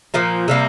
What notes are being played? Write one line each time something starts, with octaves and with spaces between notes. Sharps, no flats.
A#2 F3 A#3
C3 G3 A#3